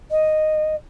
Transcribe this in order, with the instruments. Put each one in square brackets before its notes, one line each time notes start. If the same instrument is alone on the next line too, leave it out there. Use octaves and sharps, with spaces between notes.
[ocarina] D#5